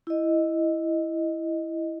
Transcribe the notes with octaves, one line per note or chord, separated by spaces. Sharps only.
E4 D#5